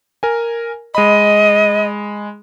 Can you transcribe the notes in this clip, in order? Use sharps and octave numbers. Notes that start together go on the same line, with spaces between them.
A#4 G#5
G#3 D#5 B5